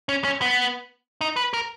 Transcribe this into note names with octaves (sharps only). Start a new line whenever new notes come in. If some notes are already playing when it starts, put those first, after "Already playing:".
C#4
C#4
B3
D#4
B4
A#4